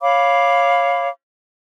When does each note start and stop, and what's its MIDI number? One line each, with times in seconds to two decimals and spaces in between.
0.01 1.10 73
0.01 1.10 77
0.01 1.10 83
0.01 1.10 86